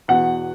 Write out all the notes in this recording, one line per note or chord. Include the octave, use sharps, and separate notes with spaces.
E2 B2 F#5